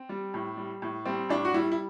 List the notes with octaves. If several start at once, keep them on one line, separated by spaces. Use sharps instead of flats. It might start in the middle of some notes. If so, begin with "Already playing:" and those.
Already playing: C4
G3
A2
G3
A2
G3 C4
A2 D4
F#4
G3 E4
E4